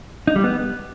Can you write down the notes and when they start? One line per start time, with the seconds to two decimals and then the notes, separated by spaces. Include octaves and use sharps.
0.27 D#4
0.36 G3
0.44 B3